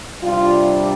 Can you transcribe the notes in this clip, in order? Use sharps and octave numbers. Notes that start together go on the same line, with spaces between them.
C3 G3 D4 F4